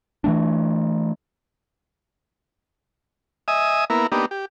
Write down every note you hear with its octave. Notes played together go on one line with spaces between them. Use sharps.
E3 A3 D4
D#5 E5 G#5 D#6
A#3 B3 E4 A#4
A#3 B3 D4 D#4 G4
G4